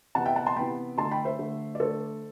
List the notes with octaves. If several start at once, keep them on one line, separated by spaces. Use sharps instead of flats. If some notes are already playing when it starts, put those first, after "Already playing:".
C3 E3 B3 F#5 A5
E5 G5
F#5 A5
A5 C6
C3 E3 B3 G5 B5
D3 A3 A5 C6
G5 B5
C5 E5
D3 A3
D5
D3 A3 A4 C5